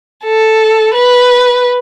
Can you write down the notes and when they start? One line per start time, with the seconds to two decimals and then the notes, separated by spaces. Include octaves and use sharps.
0.25 A4
0.94 B4